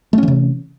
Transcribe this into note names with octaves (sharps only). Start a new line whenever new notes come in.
C3 E3 A3 C#4